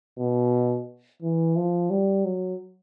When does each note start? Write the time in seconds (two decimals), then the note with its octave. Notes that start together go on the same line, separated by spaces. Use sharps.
0.19 B2
1.22 E3
1.56 F3
1.90 G3
2.25 F#3